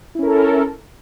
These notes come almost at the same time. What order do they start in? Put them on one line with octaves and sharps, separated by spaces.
E4 C#4 A#4 A4